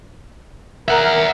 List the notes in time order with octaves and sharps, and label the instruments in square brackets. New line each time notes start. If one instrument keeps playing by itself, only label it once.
[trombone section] A#4 [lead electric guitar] E5 F#5